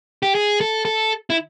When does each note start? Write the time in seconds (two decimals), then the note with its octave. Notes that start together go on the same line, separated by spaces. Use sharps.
0.23 G4
0.35 G#4
0.61 A4
0.85 A4
1.30 E4